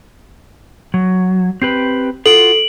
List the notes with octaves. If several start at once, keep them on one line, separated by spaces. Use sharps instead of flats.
F#3
C4 G4 B4 C7
F4 F#4 A4 D7 F#7